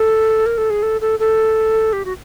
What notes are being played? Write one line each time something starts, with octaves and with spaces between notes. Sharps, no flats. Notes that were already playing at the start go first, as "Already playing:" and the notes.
Already playing: A4
A#4
A4
G#4
A4
A4
A4
G4
F#4